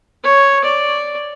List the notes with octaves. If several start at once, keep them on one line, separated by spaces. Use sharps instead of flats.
C#5
D5